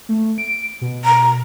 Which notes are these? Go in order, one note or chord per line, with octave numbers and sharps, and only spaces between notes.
A3
D7
B2
A#5